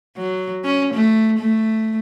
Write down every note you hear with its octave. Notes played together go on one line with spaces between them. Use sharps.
F#3
C#4
A3
A3